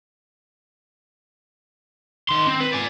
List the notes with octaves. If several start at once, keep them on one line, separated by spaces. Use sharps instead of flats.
D#3 C6
C4
B4
D5 G#5